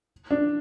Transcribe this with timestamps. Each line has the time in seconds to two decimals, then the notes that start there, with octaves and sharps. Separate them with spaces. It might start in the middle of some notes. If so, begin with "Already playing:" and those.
0.31 D4